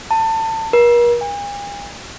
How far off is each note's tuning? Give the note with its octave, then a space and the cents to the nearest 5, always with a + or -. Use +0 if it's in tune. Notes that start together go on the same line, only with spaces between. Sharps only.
A5 +25
A#4 +40
G#5 -45